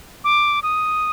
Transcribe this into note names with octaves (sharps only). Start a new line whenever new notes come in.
D6
D#6